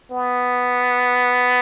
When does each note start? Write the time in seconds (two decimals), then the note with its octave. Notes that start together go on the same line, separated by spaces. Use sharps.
0.11 B3